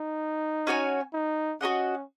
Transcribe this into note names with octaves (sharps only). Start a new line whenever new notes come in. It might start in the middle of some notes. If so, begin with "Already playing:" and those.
Already playing: D#4
C#4 F#4 C#5 G#5
D#4
C#4 F#4 A#4 D#5 F#5